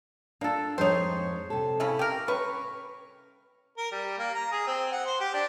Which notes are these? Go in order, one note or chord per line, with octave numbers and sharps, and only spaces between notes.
A#3 D4 F4 A4
F2 G#3 D#4 C5 C#5
C3 A4
C#3 C#4 E4
G4 A#4
C#4 B4 C#6
A#4
G3
A#3
A#5
G#4
C4
F#5
C5
G4
D4